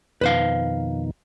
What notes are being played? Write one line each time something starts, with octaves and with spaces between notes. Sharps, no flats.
F2 B2 D#3 B4 C5 F5